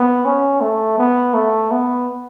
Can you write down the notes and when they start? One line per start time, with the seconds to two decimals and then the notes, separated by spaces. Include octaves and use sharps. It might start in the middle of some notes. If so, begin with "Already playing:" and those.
Already playing: B3
0.25 C#4
0.60 A3
0.98 B3
1.34 A3
1.71 B3